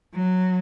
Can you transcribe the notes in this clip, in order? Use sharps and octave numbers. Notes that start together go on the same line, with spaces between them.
F#3